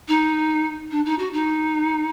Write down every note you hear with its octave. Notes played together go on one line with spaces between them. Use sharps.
D#4
D4
D#4
F#4
D#4